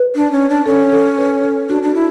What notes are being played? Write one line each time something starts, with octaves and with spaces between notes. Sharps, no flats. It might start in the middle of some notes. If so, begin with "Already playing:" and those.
Already playing: B4
D4
C#4
D4
C#4 A4
A4
B4
A4
D4 F#4
D4
E4